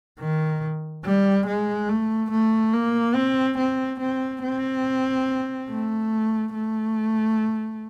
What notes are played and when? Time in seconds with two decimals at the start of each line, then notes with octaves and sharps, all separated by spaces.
0.19 D#3
1.04 G3
1.46 G#3
1.89 A3
2.31 A3
2.73 A#3
3.15 C4
3.58 C4
4.00 C4
4.43 C4
5.69 A3
6.53 A3